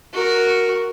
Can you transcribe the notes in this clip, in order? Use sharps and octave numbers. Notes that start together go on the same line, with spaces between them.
F#4 A#4